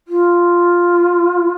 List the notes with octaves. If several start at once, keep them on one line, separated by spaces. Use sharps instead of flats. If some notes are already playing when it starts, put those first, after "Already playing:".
F4